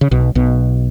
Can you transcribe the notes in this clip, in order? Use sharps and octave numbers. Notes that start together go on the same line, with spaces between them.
C#3
B1 B2
B1 B2